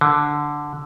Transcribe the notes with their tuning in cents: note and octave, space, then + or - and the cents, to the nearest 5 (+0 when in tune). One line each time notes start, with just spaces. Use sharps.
D3 +0